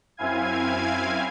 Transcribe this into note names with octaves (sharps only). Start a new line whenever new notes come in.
F#2 C4 E4 F5 G#5 G#6